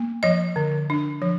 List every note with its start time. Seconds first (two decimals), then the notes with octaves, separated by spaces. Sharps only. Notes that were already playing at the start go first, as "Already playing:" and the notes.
Already playing: A#3
0.23 F3 D#5
0.56 D3
0.90 D4
1.22 F3